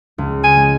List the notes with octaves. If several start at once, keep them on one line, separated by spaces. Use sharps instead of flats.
C#2
G#5
G#3